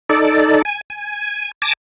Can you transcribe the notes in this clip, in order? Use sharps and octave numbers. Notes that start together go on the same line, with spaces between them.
D#4 A4 D5
G#5
G#5
G#5 A5 D6 A#6